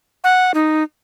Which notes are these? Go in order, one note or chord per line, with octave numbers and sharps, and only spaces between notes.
F#5
D#4